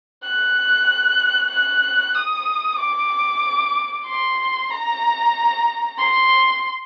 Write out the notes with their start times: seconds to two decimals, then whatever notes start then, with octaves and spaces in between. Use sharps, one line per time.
0.23 F#6
1.51 F#6
2.15 D#6
2.79 D6
4.06 C6
4.70 A#5
5.98 C6